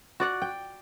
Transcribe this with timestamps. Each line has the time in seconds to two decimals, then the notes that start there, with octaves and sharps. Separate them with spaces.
0.20 F#4 D5 F#5
0.42 G5